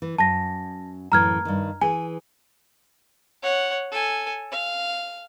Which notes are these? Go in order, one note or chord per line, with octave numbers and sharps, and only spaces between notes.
E3
F#2 A5 A#6
F#2 A2 E3 A#5 F6 G#6
G2 D#3
E3 G#4 G#5
C#5 F#5
A4 G#5
F5